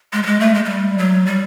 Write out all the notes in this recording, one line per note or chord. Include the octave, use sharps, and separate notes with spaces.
G#3
G3
G#3
A3
G#3
G#3
G3
F#3
G3